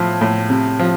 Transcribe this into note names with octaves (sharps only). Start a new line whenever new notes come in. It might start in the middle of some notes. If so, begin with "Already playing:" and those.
Already playing: A2 F3
A2
C3
F3